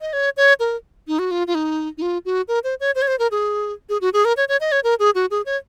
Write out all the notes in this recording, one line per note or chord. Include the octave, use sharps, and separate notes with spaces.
D#5
C#5
C#5
A#4
D#4
F#4
F4
F4
D#4
D#4
F4
F#4
A#4
C5
C#5
C5
C#5
C5
A#4
G#4
G#4
F#4
G#4
A#4
C#5
C#5
D#5
C#5
A#4
G#4
F#4
G#4
C#5